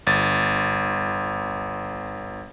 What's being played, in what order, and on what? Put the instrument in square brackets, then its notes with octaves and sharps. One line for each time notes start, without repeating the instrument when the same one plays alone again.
[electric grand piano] G1 A6